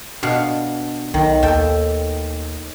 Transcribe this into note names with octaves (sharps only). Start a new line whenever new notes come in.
B2 D4 F5
B1 D#3
D#2 A4 G5